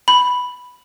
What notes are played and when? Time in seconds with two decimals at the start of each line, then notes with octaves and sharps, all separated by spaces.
0.08 B5